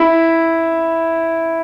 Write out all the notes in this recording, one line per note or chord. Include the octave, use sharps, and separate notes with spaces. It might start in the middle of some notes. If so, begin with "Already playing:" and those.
Already playing: E4